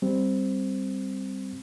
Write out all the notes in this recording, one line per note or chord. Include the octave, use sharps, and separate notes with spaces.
G3 C4